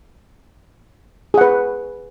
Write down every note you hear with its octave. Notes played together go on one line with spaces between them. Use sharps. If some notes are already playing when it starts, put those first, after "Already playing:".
G#4 B4 F#5